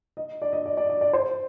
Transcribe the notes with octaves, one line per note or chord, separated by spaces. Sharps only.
D#5
D5
D#5
D5
D5
D5
D5
C5